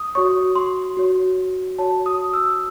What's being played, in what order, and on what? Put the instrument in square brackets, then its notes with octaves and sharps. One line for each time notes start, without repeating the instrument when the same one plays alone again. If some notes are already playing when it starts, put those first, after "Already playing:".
Already playing: [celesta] D#6
F#4 C#5 C#6
C6
F#4 C#5
F#4 C#5 A5
D#6
E6